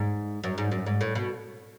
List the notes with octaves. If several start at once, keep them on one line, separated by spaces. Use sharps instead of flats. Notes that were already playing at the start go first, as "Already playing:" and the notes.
Already playing: G#2
F#2
G#2
F#2
G#2
A2
B2